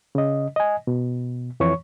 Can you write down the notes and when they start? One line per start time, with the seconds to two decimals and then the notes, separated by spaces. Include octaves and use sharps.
0.15 C#3 D#5
0.56 D#5 G#5
0.87 B2
1.60 F2 E3 C#5 C#6